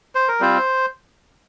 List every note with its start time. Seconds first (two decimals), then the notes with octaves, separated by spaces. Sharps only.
0.15 C5
0.28 A#4
0.40 G3 C4 F4 C5